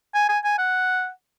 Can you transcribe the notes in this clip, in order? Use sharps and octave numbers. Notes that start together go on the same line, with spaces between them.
G#5
G#5
G#5
F#5